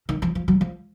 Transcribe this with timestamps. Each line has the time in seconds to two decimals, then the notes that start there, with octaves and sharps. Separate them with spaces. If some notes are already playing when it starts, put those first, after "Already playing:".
0.09 D#3
0.22 F3
0.35 F3
0.48 F#3
0.61 F3